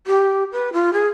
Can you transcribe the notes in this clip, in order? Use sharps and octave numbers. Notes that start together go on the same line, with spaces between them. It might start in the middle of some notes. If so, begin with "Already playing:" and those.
G4
B4
F4
G#4